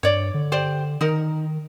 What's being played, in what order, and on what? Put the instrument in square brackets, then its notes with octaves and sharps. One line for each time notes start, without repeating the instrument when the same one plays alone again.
[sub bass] G2 [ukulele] C#5 D5
[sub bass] D3
[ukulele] G4 C5 D5
[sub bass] D#3 [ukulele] D#4 A#4